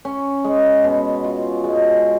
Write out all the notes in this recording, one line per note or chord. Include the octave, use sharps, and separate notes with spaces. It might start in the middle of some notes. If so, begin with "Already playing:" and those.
C#4
G#3
B2
F4
G#3